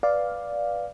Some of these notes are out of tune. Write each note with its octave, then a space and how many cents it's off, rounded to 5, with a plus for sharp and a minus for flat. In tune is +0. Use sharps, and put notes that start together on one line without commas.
B4 +0 D5 +0 F5 +5